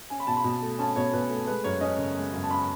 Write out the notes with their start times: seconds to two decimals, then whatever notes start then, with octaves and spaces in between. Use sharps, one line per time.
0.10 C#4 G#5
0.20 B5
0.27 B2 A5
0.36 B5
0.44 B2
0.62 A3
0.79 C#4 A5
0.96 B2 C#5
1.13 B2 B4
1.30 A3
1.47 G#3 B4
1.64 F#2 C#5
1.81 C#4 D#5
1.98 C#3
2.16 G#3
2.33 F#2
2.43 A5
2.49 C#4 B5